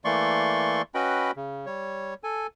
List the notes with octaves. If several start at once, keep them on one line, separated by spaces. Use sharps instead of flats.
E3 A3 A#3 D5 C6 C#6
C#4 F#4 B4 D#5 G5 B5
C#3
G3 C#5
A4 G#5